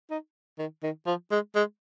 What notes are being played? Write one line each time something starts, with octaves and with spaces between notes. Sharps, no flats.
D#4
D#3
D#3
F3
G#3
G#3